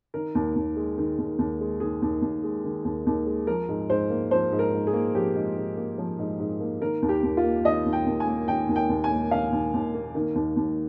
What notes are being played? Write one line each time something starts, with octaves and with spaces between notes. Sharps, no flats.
D#3 A#4
D#2
D#2
G#3
D#3
D#2
D#2
G#3
D#3 G#4
D#2
D#2
G#3
D#3
D#2
D#2
G#3
F3 A#4
G#2
G#2 C5
A#3
F3 C5
G#2
A#4
G#2
G#4
A#3
F3 G4
G#2
G#2
A#3
F3
G#2
G#2
A#3
D#3 A#4
D#2
G4
D#2
F4
A#3
D#3 D#5
D#2
G5
D#2
G#5
A#3
D#3 G5
D#2
G5
D#2
G#5
A#3
D#3 F5
D#2
D#2
A#3
D#3
D#2
D#2